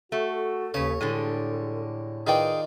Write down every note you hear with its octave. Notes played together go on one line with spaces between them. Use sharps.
A3 F#4 A4
D#2 C#3 B4 C#5
A2 D3 G3 G#3
D#3 F4 G#4 B4 D5 G5